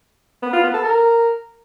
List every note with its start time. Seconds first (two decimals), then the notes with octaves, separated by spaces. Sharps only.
0.43 B3
0.53 F4
0.64 B3
0.74 A4
0.84 A#4